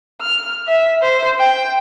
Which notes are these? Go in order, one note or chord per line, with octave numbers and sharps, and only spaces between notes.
F6
E5
C5
G5